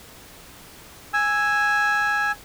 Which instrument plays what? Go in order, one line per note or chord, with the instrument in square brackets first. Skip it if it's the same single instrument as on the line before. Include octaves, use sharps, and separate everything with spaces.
[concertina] G#5 E6